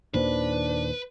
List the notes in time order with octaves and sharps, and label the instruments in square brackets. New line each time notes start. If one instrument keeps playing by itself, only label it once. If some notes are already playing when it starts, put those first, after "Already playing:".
[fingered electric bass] D#2 A#2 D#3 [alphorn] D4 [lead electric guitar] B4 [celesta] C5